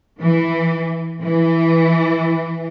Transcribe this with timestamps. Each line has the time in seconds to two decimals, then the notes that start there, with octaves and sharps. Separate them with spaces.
0.19 E3
1.22 E3